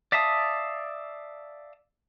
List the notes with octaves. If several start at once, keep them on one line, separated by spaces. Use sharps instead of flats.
D5 E5 F5 A5 D#6